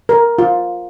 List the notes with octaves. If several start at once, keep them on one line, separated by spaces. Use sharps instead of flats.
A#4
F4